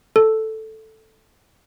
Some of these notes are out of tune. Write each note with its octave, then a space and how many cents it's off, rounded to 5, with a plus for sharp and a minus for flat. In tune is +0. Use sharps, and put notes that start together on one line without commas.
A4 +0